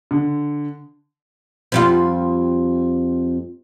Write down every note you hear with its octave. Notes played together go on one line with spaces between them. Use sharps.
D3
F2 G3 F4